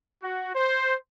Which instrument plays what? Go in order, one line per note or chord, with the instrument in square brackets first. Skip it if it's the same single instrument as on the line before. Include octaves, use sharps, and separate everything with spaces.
[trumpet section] F#4
C5